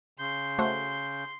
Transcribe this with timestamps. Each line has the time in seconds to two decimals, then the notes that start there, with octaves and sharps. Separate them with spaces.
0.19 C#3 C6 G6
0.59 A3 F#4 C5